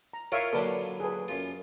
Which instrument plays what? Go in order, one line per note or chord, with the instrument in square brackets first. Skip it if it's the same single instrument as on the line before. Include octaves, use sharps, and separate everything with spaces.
[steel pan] A#5
[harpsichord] E4 F4 A#4 [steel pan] C#5 E5 F5
[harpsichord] A#2 D3 F#3 [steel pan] A4 B4 D5
[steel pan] G#4 A4 B4
[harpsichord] F#2 F4